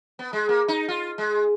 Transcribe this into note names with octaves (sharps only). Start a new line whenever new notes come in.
B3
G#3
A#3
D#4
F4
G#3